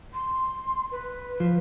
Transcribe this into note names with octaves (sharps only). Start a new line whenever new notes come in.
C6
B4
F3